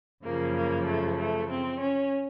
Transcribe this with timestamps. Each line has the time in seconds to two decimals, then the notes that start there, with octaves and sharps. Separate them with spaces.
0.25 F#2 C#3 F3 A#3
0.56 A#3
0.87 A3
1.18 A3
1.50 C4
1.81 C#4